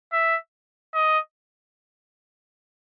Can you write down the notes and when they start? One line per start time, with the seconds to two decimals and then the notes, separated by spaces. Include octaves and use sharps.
0.13 E5
0.94 D#5